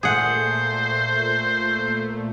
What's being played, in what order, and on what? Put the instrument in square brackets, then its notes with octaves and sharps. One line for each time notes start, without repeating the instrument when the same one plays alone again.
[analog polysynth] A#2 A3 [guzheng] G#4 F#5 [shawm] C5